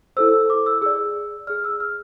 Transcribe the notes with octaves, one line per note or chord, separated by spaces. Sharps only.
E4 A4 C5 E6
D6
E6
G#4 D5 E6
G#4 D5 F6
E6
F6